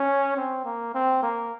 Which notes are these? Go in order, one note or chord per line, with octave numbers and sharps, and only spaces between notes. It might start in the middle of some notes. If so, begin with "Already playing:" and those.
Already playing: C#4
C4
A#3
C4
A#3